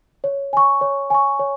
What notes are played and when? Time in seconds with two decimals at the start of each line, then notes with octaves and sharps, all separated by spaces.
0.24 C#5
0.53 G#5 C#6
0.81 C#5
1.10 G#5 C#6
1.39 C#5